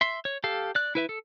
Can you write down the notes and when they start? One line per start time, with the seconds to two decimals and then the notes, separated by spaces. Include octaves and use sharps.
0.01 E5 C6
0.25 C#5
0.44 G4 A4 F5
0.75 D5 F#6
0.95 E4 B4 E5
1.09 A4